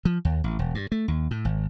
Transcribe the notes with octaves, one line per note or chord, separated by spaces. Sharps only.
F3
D#2
A1
E1
G2
A3
D#2
A2
G#1